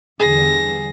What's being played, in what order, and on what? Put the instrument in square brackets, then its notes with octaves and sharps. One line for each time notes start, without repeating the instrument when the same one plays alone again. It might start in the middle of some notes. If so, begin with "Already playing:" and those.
[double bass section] E2 D3 G3 [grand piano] G#4 [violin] A#6